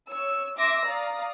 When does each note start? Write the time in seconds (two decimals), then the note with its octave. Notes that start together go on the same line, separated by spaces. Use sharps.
0.10 C#5 E6
0.58 E5 C6 D6 E6 A#6
0.87 D5 F5 A#5 D#6